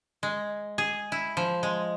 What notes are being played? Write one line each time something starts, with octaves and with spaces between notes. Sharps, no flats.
G#3
G#4
E4
F3
G#3